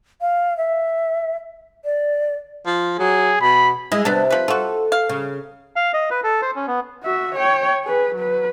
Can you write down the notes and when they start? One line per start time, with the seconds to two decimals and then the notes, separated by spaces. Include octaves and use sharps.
0.21 F5
0.57 E5
1.85 D5
2.66 F3
2.99 F#3 G#4
3.41 B2 B5
3.92 G#3 E4 D#5
4.05 C3 B3 D4 A5
4.30 F3 B4
4.48 F4 F#4 A4
4.92 F5
5.09 C#3
5.76 F5
5.94 D#5
6.10 B4
6.24 A4
6.42 C5
6.56 C#4
6.67 B3
7.03 F#4 E5
7.35 C#5 G5
7.84 G#4 B4
8.16 F#3 B4